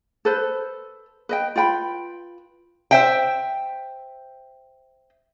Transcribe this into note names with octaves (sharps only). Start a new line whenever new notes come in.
A4 B4 C5
B4 D#5 G5
F4 B4 G5 B5
C5 E5 G5